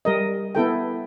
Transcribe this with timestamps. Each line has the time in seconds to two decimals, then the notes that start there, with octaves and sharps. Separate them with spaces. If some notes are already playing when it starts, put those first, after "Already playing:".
0.05 G3 A#4 D#5
0.55 B3 E4 A4 G5